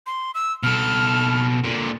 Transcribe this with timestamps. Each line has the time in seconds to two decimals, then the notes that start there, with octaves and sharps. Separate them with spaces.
0.07 C6
0.35 E6
0.63 B2 A4 F6
1.64 A#2 D3